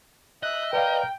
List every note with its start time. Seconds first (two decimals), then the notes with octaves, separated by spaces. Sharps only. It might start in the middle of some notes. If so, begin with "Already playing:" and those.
0.43 D#5 E5 F#6
0.73 A#4 B4 D5 F5 G5